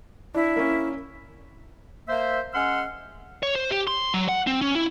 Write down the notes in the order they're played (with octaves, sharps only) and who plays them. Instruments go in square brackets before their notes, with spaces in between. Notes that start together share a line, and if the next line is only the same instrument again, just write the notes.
[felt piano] D4 [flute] E4
[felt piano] A#3 C#4
[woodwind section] A#3 C5 E5
G#3 C#4 F#5 C6 E6 F6
[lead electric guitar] C#5
C5
G4
C6
F#3
F#5
C4
C#4
E4